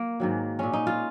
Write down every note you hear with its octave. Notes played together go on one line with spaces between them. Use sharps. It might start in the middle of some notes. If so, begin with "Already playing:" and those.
Already playing: A#3
G#2 D#3 F#3
A#2 G#3 C#4
D#4
F4